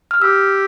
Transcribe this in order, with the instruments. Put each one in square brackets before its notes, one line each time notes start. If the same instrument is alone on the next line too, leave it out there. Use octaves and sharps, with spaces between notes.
[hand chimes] F6
[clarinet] G4 [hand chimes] E6